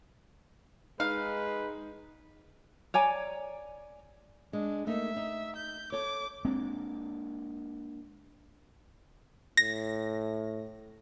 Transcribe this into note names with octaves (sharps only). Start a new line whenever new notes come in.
G#3 D#4 B4 F5
C#5 D5 G#5 A#5
G#3 D4
A3 A#3 D#4 E5
D#4
G6
A4 C#5 D6
G#3 A#3 C4 D4
A2 A#6